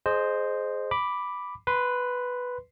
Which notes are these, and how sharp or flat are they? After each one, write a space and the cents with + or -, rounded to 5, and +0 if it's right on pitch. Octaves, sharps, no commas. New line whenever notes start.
G#4 +20 C5 +0 D#5 -20
B5 +0 D6 +0
B4 +0 C6 -20